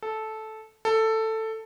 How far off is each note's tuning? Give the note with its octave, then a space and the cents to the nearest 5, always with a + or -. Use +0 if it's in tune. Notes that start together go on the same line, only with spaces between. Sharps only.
A4 -10
A4 +10